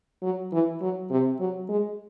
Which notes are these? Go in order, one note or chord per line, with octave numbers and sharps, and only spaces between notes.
F#3
E3
F#3
C3
F#3
G#3